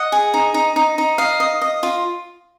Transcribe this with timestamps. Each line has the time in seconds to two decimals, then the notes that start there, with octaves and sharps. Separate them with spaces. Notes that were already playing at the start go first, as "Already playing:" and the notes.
Already playing: D#5 F#5
0.12 G#4
0.34 D#4
0.54 D#4
0.76 D#4
0.98 D#4
1.18 D#5 F5
1.40 D#5
1.62 D#5
1.83 F4